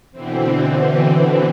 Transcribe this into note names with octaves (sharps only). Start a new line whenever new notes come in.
B2 D3 E3 C4